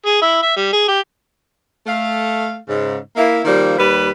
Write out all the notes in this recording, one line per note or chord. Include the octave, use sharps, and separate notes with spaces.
G#4
E4
E5
G3
G#4
G4
A3 F5
G#2 C#3
A#3 E4
D#3 F3 G3 A#3
D#2 G3 B4